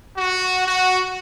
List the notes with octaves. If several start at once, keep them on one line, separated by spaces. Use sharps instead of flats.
F#4
F#4